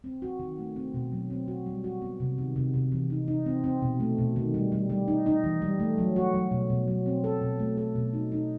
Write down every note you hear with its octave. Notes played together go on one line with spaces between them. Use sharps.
C4
F#4
D#3
A3
C4
B2
F#3
C4
F#4
G3
F#4
B3
C3
D#3
C3
C3
E3
D#4
D#4
C4
C4
B2
A3
B2
D#3
G3
G3
G3
D#4
D#4
E3
G3
A3
F#3
F#4
F#3
B2
B2
F#3
C4
A4
B2
A3
A4
B2
D#4
D#4